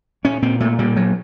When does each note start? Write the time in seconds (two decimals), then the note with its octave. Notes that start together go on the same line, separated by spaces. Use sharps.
0.24 A#2 C#4
0.42 A#2 C4
0.60 A#2 A3
0.79 A#2 G3
0.96 A#2 F#3